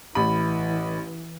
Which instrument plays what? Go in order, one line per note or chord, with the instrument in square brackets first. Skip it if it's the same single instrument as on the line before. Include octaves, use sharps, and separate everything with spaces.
[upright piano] A1 B5 [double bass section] E3